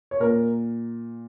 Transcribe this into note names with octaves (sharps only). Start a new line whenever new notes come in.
C#5
A#2 A#4